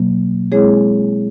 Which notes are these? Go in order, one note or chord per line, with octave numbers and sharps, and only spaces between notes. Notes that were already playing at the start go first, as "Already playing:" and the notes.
Already playing: B2 F#3 A#3
G#3 C4 E4 G#4 C#5